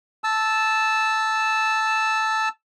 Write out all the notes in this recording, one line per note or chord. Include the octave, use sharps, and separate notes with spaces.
A5 E6